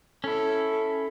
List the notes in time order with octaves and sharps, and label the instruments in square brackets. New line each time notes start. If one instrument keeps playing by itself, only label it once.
[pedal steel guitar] C#4 E4 [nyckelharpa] A4